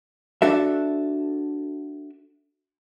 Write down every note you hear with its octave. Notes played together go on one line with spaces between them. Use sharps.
D4 F#4 A4 E5